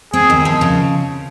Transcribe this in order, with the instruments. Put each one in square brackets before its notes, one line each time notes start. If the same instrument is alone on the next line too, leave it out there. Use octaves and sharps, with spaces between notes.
[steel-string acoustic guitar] C4 [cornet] G#4
[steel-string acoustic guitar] D#2
F3
C#3